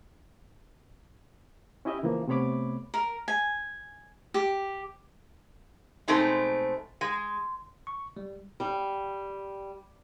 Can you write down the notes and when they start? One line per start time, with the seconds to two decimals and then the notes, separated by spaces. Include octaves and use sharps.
1.85 C#4 E4 G4 D#5 E5
2.03 C#3 E3 F3 A#3
2.27 C3 A3 B3 C#5 B5 D6
2.94 A#4
3.28 G#5
4.34 G4
6.08 B2 G#3 A3 C4 D#4
7.01 G#3
7.87 C#6
8.17 G3
8.60 G3